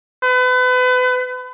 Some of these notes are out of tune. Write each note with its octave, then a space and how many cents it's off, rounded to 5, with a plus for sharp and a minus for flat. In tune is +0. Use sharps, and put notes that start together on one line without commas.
B4 +35